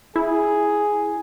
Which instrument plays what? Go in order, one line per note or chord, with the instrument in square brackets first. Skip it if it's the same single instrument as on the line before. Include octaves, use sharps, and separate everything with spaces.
[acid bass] E4 [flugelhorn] G#4